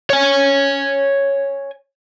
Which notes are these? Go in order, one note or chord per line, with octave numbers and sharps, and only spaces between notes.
C#5 G#5